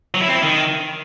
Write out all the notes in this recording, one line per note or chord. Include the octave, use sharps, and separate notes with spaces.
F#3
E4
C4
E4
D#3